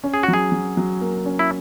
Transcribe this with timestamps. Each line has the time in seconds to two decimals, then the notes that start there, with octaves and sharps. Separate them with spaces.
0.04 C#4
0.14 G#4
0.23 F#3 F#4
0.33 G#4
0.52 F#3
0.77 F#3
1.01 A#3
1.26 C#4
1.39 E4